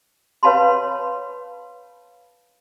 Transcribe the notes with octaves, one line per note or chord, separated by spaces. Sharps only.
B4 C#5 F5 A5 B5 C6